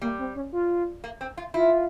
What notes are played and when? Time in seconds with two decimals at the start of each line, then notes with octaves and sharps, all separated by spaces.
0.02 G3 A#3
0.19 C4
0.35 C#4
0.53 F4
1.04 A#3
1.21 C4
1.37 F4
1.54 E4 F4